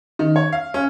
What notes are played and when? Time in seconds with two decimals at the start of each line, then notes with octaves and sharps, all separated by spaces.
0.19 D#3
0.36 C#5
0.52 F5
0.74 C#4